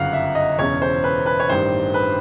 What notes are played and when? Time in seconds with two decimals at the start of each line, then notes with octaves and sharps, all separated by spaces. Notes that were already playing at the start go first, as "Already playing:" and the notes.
Already playing: G1 F#2 C#3 F5 F#5
0.13 E5
0.35 D#5
0.58 E1 E2 C#3 C#5
0.82 C5
1.04 B4
1.26 B4
1.40 C#5
1.49 A1 G2 D#3 C5
1.94 B4